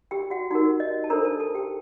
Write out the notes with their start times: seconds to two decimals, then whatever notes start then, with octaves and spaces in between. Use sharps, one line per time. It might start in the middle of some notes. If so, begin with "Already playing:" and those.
0.11 G4 G5
0.30 F#4 F#5
0.50 D#4 F#4 G4 A#4 F#5
0.80 D#5
1.04 A5
1.10 D4 A4 A#4 C5 A#5
1.25 A4 A5
1.40 A4 A5
1.54 G4 G5